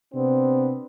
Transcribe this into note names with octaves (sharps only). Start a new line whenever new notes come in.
C3 B3 C4 D4